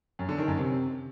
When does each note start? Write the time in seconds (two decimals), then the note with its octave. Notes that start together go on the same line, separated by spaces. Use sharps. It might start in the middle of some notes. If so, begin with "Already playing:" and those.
0.19 F#2
0.29 D3
0.38 D#3
0.48 F#2
0.57 C3